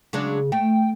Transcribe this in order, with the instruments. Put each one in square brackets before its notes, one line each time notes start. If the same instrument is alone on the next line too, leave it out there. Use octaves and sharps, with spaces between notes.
[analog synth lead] C#3 [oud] F#3 G#3 D4
[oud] A3 [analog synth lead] G5